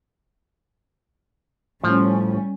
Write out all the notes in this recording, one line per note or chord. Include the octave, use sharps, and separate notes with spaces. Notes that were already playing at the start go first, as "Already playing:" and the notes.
A2 F3 G3 C#4